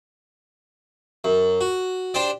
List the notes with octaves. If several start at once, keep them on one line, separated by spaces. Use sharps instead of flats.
F#2
F#4
D4 G4 C5 D5